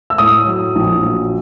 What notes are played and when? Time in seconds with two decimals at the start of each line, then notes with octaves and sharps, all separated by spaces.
0.10 E6
0.18 A2 D#6
0.47 F#3
0.75 A#1
1.03 F#3